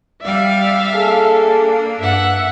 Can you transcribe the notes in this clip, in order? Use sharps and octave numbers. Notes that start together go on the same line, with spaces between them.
G3 D5 E5 F5
A#3 D4 G#4 A4
G2 E5 F#5